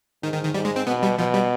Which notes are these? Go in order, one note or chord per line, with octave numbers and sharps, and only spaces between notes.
G#2 D#3
D#3
D#3
G#2 G3
G#3
C4
B2 B3
G3
B2 F3
G3